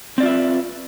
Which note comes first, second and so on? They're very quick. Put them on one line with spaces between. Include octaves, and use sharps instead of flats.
C4 D5 F4 E5 B4